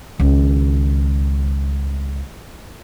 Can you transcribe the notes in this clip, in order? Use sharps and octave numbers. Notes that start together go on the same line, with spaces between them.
C#2 D#3